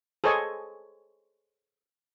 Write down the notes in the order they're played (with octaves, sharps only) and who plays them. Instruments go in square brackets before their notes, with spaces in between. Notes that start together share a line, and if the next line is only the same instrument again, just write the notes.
[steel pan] G#4 A4 C5 C#5 D#5 G#5